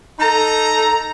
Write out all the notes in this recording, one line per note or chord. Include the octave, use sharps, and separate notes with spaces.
D#4 A4 A#5